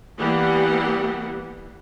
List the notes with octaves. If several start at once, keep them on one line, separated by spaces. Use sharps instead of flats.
E3 G3 A#3 B3 G4 F#5